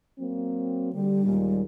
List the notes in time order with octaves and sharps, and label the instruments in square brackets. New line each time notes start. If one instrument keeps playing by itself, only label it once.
[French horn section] F#3 A#3 C4
[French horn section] D3 G4 [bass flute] G3
[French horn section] D#2 A#2 G#3